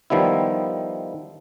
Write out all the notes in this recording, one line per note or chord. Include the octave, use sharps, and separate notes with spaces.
D#3 F3 G3 B3 E4